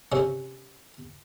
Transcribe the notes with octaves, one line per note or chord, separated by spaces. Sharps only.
C3 C#4